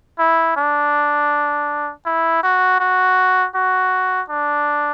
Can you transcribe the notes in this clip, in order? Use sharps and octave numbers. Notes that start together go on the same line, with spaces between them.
E4
D4
E4
F#4
F#4
F#4
D4